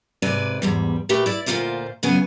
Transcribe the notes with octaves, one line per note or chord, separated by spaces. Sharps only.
G#2 C3 B4 D5 G#5
E2 G#2 G3
A#2 A3 G4 B4
E4 D5
D2 A#2 F3 F4 C5 D5
C#3 F#3 B3 G#5